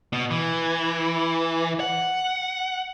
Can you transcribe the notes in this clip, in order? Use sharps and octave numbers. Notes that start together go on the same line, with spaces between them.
B2
E3
F#5